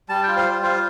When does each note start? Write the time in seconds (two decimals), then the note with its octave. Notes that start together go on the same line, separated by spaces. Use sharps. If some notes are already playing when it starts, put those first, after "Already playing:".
0.09 G3 A5
0.23 F4 G5
0.37 C5
0.45 G3
0.62 F4 C5